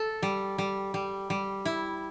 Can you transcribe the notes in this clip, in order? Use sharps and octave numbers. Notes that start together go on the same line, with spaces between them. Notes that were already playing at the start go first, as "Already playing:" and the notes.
Already playing: A4
G3
G3
G3
G3
E4